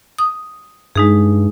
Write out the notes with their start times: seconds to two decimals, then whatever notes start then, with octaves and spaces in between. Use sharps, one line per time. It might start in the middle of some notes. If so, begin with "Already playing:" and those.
0.19 D#6
0.96 G2 G#3 D#4 G#4